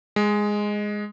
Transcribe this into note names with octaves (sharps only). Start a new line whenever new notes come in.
G#3